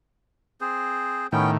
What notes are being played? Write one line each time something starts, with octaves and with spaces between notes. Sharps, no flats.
C4 G#4 C5
A2 D#3 B3 C#4 G5